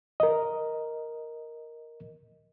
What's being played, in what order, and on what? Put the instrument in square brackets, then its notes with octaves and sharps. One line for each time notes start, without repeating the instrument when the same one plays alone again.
[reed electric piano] A#4 D#5